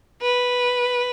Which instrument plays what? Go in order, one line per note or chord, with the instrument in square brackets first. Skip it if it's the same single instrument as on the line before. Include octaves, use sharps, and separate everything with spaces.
[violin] B4